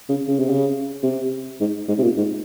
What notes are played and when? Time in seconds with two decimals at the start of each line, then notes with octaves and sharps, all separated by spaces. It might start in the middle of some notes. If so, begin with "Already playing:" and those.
0.09 C#3
0.28 C#3
0.39 C3
0.49 C#3
1.03 C3
1.60 G#2
1.88 G#2
1.98 C3
2.03 A#2
2.17 G#2